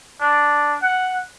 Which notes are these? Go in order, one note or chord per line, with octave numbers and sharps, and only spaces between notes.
D4
F#5